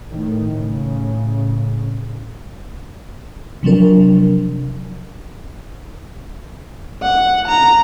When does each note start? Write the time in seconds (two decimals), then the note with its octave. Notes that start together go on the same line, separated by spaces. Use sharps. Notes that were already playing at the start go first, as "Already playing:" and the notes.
0.11 A2 D#3
0.48 A2 C#3
3.63 C3 F3 F#3 D4 A#4
7.02 F#5
7.48 A#5